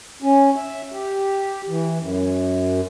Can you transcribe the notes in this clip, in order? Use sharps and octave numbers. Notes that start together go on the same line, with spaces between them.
C#4
E5
G4
E3
F#2